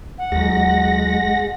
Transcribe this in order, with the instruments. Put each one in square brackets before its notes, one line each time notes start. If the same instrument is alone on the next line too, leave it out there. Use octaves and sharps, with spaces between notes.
[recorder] F#5
[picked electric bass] D#2 F#3 [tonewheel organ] G#3 A#6